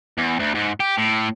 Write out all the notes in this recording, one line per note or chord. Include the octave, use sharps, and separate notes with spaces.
E2
D2
G#2
G4
A2